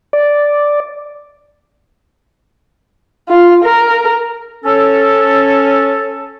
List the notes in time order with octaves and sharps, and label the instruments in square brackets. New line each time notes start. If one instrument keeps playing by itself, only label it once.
[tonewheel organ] D5
[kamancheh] F4
A#4
[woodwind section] C#4 A4